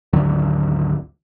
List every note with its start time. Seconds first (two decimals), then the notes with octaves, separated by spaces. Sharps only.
0.13 G#1 D2 D3 F#3